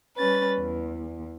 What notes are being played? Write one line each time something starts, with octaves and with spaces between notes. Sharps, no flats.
G3 C#4 B4 A6
E2